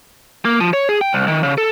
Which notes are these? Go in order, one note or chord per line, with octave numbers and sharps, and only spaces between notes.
A#3
F3
C#5
G#4
G5
C2
D#3
C#3
A4